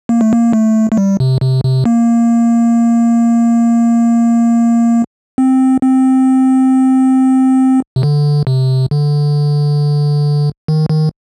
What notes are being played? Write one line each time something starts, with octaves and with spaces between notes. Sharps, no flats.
A#3
A3
A#3
A3
A3
G3
C3
C3
C3
A#3
C4
C4
C3
D3
C3
D3
D#3
D#3